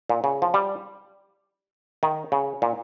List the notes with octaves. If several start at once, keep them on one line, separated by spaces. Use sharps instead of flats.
A#2
C#3
F3
G3
D#3
C#3
A#2